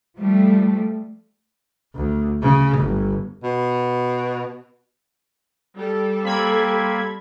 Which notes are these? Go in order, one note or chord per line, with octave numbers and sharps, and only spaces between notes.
F3 G3 A3
D2
C#3
G1
B2
G3 A4
A#3 C4 B5 G#6